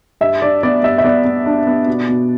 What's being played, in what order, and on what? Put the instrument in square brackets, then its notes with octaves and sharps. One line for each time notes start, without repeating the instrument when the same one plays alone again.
[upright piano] G2 E5
D4 D5
B3 D5
G2 E5
E5
B3 D5
B3
D4
B3
B2
B2